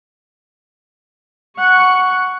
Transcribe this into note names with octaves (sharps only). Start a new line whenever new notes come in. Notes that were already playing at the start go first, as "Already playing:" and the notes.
F#5 C#6